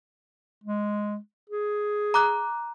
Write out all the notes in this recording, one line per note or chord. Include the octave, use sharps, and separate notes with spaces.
G#3
G#4
A#5 D6 F#6